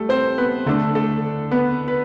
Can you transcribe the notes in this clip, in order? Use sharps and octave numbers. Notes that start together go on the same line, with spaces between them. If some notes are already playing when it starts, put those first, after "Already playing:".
Already playing: G3 A3 A4
C4 C5
B3 B4
D3 A3 D4 A4
A3 A4
B3 B4
B4